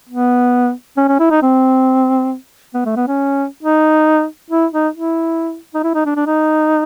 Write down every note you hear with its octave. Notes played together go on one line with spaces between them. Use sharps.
B3
C#4
C#4
E4
D#4
C4
B3
A3
B3
C#4
D#4
E4
D#4
E4
D#4
E4
D#4
D4
D4
D#4